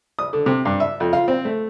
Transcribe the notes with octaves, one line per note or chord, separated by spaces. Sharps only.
D#6
D3
C3
G2
E5
F2
F4
C4
A3